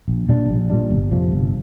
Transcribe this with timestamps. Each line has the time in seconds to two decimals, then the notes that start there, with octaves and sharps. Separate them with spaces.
0.08 A#1
0.29 A#2 G3 D4
0.49 A#1
0.70 A#2 G3 D4
0.90 G1
1.11 F2 C3 F3
1.31 G1